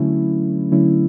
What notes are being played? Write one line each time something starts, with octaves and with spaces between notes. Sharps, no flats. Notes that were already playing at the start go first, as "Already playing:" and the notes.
Already playing: D3 F#3 A3 C#4 E4
D3 F#3 A3 C#4 E4